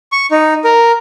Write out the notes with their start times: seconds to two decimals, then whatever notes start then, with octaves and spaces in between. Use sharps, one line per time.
0.12 C#6
0.31 D#4
0.64 A#4